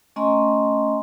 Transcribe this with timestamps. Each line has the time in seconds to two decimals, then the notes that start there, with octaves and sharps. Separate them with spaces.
0.16 A3 C#4 D#5 G#5 A#5 C6